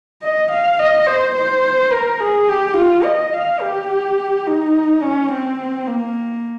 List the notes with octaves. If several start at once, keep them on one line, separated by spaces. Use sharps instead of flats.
D#5
F5
D#5
C5
C5
A#4
G#4
G4
F4
D#5
F5
G4
D#4
C#4
C4
A#3